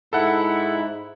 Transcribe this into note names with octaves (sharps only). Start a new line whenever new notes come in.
G#2 E4 A4 F#5